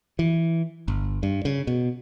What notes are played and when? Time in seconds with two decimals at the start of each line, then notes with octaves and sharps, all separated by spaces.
0.19 E3
0.88 G1
1.23 G2
1.45 C#3
1.67 B2